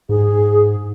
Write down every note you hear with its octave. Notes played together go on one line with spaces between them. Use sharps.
G#2 G#4